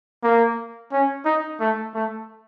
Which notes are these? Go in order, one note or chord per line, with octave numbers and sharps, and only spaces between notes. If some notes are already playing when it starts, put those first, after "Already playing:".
A#3
C#4
D#4
A3
A3